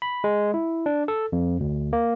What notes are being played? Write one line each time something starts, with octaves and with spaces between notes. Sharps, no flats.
B5
G#3
E4
D4
A4
F2
D2
A#3